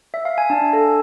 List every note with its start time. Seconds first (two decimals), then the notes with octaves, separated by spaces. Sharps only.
0.14 E5
0.25 F5
0.38 G#5
0.50 D4 A5
0.73 A4